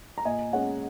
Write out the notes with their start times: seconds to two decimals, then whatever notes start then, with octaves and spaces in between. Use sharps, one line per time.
0.18 A#5
0.25 A#2 D#5 G#5
0.53 G#3 C#4 C#5 F#5